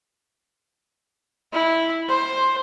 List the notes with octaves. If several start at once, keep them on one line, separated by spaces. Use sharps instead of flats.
E4
C5